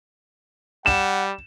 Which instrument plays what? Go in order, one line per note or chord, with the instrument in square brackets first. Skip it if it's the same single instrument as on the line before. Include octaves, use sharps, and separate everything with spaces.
[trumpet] G3 [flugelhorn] F#5 [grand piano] E7